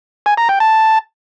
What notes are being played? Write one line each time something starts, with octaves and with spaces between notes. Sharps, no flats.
G#5
A#5
G5
A5